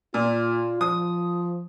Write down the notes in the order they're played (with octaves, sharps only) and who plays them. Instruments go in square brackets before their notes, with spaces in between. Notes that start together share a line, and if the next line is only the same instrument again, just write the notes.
[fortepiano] A#2 [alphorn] F4
[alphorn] F3 [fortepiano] D#6